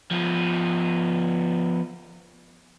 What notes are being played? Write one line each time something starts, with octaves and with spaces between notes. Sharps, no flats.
F3 B3